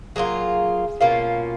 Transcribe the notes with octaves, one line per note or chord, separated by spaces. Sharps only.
F#3 A#3 F4 G#4
B2 A#3 C#4 F4